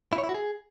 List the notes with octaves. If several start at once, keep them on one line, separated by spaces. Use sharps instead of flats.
E4
C#5
E4
F#4
G#4